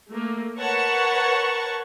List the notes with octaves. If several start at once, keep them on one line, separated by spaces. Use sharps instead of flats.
A3 A#3
A#4 B4 C#5 F#5 A5 C#6